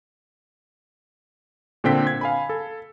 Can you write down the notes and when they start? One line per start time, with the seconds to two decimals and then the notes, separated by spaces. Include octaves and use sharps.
1.84 A#2 D3 C4 G5 B6
2.07 G#6
2.21 F5 G#5 B5
2.49 A4